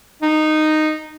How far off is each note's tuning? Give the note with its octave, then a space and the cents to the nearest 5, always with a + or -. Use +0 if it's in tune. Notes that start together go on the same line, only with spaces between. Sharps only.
D#4 -10